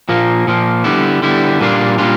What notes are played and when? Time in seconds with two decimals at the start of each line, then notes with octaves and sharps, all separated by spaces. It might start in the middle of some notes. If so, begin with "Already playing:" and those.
0.09 A#2 F3 A#3
0.47 A#2 F3 A#3
0.84 D3 G3 B3 E4
1.22 D3 G3 B3 E4
1.61 A#2 G3 A#3 D4 F4
1.98 A#2 G3 A#3 D4 F4